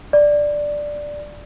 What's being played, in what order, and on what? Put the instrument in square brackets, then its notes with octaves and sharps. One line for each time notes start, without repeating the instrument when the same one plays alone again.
[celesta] D5